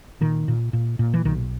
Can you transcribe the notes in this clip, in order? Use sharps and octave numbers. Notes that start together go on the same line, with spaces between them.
A#2 D#3
A#2
A#2
A#2
E3
B1 D#3